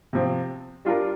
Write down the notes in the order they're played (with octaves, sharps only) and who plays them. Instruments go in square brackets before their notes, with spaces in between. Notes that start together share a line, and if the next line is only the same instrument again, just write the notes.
[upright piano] C3 F3 C4
G3 D4 F4 A#4